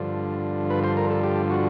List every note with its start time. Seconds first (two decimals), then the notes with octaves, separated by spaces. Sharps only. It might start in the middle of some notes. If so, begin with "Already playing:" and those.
Already playing: G2 D3 F3
0.70 B4
0.84 C5
0.97 A#4
1.10 A4
1.24 G4
1.50 F#4